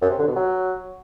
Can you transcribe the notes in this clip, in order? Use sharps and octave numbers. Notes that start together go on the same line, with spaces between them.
F#2
C3
D3
B2
F#3